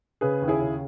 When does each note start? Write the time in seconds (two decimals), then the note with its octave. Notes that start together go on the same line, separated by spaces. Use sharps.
0.21 C#3 G#4 B4
0.41 D#2
0.48 E4 G#4
0.62 C#3